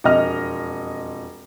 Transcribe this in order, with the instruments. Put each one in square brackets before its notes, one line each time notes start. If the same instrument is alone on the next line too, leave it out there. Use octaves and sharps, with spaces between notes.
[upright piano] E1 F2 D#5 F6